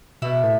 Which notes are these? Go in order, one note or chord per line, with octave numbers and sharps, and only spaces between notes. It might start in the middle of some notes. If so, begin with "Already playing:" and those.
B2 E4
A2